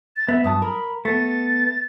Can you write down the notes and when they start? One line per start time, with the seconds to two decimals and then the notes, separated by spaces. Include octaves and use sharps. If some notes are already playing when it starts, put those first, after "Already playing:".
0.16 A6
0.29 B3 E5
0.44 G2 F#3 A5 D#6
0.62 A#4 B5
1.05 A3 B3 A6